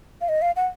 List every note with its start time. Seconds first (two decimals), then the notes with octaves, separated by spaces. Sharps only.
0.21 F5
0.29 D#5
0.42 F5
0.56 F#5